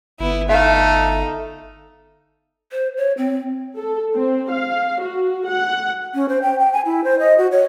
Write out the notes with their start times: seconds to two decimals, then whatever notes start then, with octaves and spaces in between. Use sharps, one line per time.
0.20 G1 B3 E4
0.49 A3 D#4 A4 E5 F5
2.72 C5
2.97 C#5
3.17 C4
3.76 A4
4.14 C4
4.50 F5
5.00 F#4
5.47 F#5
6.15 C#4
6.29 C5
6.42 G5
6.59 G5
6.73 G#5
6.86 E4
7.04 C5
7.19 D#5
7.38 F#4
7.51 C#5